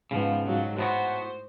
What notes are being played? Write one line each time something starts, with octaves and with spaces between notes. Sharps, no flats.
G#2 C#3 F3 B3
G#2 F#3
A2 B3 F#4 C5